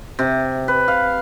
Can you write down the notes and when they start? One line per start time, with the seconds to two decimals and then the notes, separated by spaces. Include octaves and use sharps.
0.19 C3
0.68 B4
0.88 F5